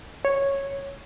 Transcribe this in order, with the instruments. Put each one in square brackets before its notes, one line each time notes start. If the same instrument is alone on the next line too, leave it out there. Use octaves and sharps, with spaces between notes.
[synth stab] C#5